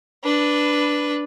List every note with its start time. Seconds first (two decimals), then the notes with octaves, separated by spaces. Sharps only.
0.24 D4 B4